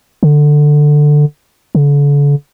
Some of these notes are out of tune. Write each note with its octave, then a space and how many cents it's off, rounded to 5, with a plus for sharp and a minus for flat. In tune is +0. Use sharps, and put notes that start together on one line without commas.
D3 +10
D3 -40